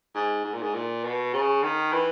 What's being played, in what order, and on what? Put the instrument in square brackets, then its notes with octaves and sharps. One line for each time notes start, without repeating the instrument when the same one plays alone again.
[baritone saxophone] G#2
G#2
A#2
G#2
A#2
B2
C#3
D#3
E3